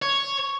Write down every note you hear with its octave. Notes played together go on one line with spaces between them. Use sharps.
C#5